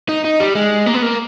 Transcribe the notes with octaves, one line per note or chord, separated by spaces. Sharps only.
D#4
D#4
G3
G#3
A#3
B3
A#3